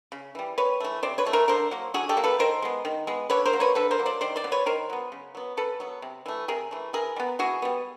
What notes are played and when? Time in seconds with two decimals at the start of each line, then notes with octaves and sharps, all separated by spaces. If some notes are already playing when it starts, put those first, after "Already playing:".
0.12 C#3
0.35 E3 G3
0.58 C3 B4 C#5
0.80 E3 A3
1.03 C3 C5 D5
1.18 B4 C#5
1.26 E3 A3
1.33 A#4 C5
1.48 D3 A#4 C5
1.71 F#3 A#3
1.94 D3 F#4 G#4
2.09 G4 A4
2.17 F#3 A#3
2.24 A4 B4
2.39 D#3 A#4 C5
2.62 G#3 B3
2.85 D#3
3.07 G#3 B3
3.30 D3 B4 C#5
3.45 A#4 C5
3.53 F#3 A#3
3.60 B4 C#5
3.75 D3 A4 B4
3.91 A#4 C5
3.99 F#3 A#3
4.06 C5 D5
4.21 D#3 C5 D5
4.36 C5 D5
4.44 B3
4.47 F#3 B4 C#5
4.66 D#3 A#4 C5
4.90 F#3 B3
5.12 C#3
5.35 F#3 B3
5.57 C#3 A4 B4
5.80 F#3 B3
6.02 C3
6.26 E3 A3
6.48 C3 G#4 A#4
6.71 E3 A3
6.93 E3 G#4 A#4
7.16 G3
7.20 B3
7.39 E3 F#4 G#4
7.62 G3 B3